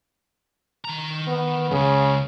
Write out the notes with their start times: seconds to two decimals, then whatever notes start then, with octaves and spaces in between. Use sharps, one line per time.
0.85 D#3 A#5
1.27 B3
1.71 C#2 F#2 C#3